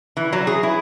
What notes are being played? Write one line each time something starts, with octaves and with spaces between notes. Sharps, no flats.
E3
F#3
G#4
E4